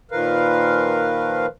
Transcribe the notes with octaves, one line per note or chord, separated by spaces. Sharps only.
A#2 D#3 F3 A#4 B4 F5